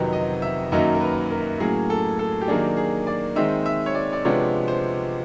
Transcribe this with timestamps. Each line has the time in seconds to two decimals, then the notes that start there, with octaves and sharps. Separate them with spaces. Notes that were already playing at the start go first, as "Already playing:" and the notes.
Already playing: F2 C3 D#3 F#3 B3
0.13 D#5
0.42 E5
0.72 F#2 D#3 F#3 A#3 D#4 E5
0.95 A#4
1.01 B4
1.31 A#4
1.60 A2 F#3 A#3 C#4 G#4
1.90 A4
2.19 A4
2.41 G4
2.48 D#3 F#3 A#3 D4 G#4
2.77 G#4
3.07 D5
3.36 D#3 G#3 C4 D#4 E5
3.66 E5
3.86 C#5
3.95 D5
4.13 D5
4.25 C3 F3 G#3 B3 D4 C#5
4.68 C5